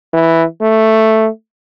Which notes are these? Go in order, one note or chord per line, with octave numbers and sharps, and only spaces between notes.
E3
A3